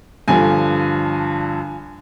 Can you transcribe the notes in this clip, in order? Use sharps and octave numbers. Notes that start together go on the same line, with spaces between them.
G2 D3 F3 G#5